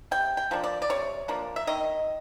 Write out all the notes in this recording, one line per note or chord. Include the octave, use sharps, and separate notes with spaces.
C3 G5
G5
F3 A#3 D4
D5
D5
C3 C#5
F3 A#3 D4
E5
D#3 D#5